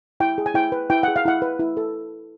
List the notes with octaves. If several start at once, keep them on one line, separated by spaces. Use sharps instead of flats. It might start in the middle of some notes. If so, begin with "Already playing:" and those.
E4 G5
G#4
G#5
E4 G5
B4
E4 G5
G#4 F#5
F5
E4 F#5
B4
E4
A4